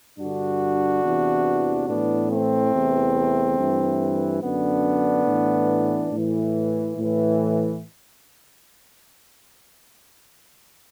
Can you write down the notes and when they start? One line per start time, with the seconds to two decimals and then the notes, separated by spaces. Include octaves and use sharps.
0.18 G2 D3 D4 F#4
1.04 E2 C3 E3
1.88 A2 E3 B3 D4
2.30 A3 C4
2.73 E2 C3 E3
3.58 G2 E3
4.42 F#2 D3 B3 D4
5.27 A2 E3
6.12 A2 E3
6.97 A2 E3